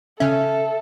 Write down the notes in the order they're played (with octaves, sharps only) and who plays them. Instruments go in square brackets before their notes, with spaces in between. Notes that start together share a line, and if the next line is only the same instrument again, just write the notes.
[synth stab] C#3 C#4 [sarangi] A4 [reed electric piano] E5